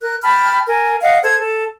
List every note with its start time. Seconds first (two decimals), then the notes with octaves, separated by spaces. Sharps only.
0.01 A#4 F#6
0.22 G5 A5 B5 F6
0.66 A#4 G#5
1.01 D#5 F5 F#5
1.23 A4 C5 G#6
1.39 A4